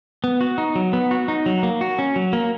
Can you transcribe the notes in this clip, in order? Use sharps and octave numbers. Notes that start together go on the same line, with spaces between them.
B3
F#4
D#4
F#3
B3
F#4
D#4
F#3
A#3
F#4
C#4
F#3
A#3